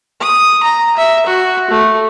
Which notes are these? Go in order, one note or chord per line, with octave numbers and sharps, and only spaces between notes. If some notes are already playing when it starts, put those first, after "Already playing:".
D#6
A#5
E5
F#4
A3